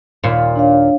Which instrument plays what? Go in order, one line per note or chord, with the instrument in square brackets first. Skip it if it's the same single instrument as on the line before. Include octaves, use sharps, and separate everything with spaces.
[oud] D#2 A#2
[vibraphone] D4 C#5 F5